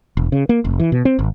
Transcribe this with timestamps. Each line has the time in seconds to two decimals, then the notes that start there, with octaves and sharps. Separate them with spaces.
0.17 E1
0.32 C#3
0.49 A#3
0.65 F1
0.80 E3
0.92 B2
1.05 C4
1.19 G#1